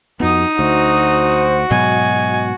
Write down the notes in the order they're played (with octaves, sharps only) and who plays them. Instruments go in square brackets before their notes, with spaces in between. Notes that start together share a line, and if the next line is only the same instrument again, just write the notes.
[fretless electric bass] F2 B3 [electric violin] D#4 D#6 [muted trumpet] F#4
[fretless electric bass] D2 [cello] F#4 [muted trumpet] C5
[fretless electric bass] G#2 B2 F#3 [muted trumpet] D#5 [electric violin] G#5